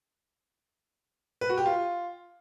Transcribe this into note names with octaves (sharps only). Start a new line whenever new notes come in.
B4
F#4
G4
F4